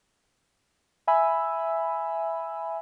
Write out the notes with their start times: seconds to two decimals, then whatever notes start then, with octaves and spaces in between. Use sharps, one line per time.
1.07 E5 G#5 B5 E6